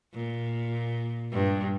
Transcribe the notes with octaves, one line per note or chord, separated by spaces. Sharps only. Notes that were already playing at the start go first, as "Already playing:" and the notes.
A#2
G2